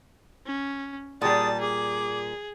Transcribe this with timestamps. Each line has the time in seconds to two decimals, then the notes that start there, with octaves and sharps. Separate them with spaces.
0.46 C#4
1.22 A#2 G3 G#4 D5 A5 D#6
1.61 G#4 D6